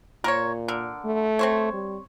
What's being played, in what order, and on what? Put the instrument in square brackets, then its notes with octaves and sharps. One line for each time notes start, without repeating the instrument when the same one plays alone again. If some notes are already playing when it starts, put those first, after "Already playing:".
[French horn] A#2 [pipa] A#4 C5 C#5
[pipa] D3 A#4
[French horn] A3
[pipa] C4 C5 C#5
[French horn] G3